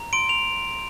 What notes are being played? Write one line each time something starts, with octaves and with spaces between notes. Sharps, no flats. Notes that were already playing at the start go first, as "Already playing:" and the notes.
Already playing: A#5
C6 D7
F7